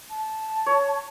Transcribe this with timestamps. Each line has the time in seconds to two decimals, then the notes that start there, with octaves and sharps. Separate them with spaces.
0.10 A5
0.66 C#5